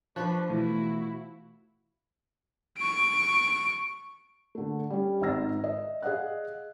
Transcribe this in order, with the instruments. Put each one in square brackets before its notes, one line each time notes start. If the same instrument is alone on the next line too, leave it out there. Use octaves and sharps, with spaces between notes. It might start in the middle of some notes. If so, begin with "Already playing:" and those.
[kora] F3 B4 [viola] D4 [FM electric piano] C5 C#6 F#6
[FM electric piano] B2 E3 A3 [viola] E4 F#4
[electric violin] C#6 D7
[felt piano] D3 A3
G3 C#4
G#1 G#2 D#4 E6 A#6
D#5 E5
G#4 D#5 F5 F#5 F#6